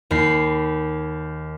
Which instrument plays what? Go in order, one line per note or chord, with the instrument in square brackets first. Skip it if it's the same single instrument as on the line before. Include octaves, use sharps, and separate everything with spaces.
[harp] D#2 B5 C7